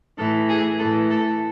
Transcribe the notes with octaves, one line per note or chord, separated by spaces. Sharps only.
A2 E3 A4
G#4
A2 E3 A4
A4